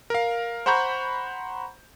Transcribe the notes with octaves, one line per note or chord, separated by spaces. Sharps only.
A#4 F5
C5 F#5 A#5 B5 C#6 G6